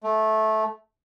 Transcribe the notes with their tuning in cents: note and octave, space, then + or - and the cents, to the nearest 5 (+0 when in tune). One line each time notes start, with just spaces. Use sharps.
A3 -15